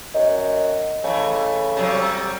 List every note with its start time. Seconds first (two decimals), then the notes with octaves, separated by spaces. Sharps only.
0.14 F#2 D#5
1.04 C#3 E3 A3
1.77 C3 F#3 G3